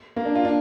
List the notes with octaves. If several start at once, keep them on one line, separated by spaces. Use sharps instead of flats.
A#3
D4
F4
D4